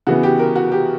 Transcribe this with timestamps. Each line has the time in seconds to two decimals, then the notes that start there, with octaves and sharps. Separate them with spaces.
0.07 C#3 E3 B3 F#4
0.23 G4
0.39 A#4
0.56 F#4
0.72 G4